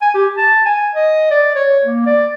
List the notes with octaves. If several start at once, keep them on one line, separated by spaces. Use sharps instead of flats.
G#5
G4
A5
G#5
D#5
D5
C#5
A#3
D5